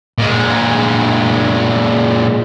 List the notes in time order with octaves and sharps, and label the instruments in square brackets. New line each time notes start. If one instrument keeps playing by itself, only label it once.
[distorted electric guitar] A#2 G#3